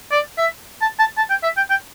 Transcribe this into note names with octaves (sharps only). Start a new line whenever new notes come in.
D5
E5
A5
A5
A5
G5
E5
G5
G5